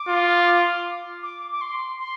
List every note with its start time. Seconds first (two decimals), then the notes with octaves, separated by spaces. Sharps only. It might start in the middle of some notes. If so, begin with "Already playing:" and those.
Already playing: D6
0.08 F4
1.23 D6
1.52 D6
1.61 C6
1.99 C6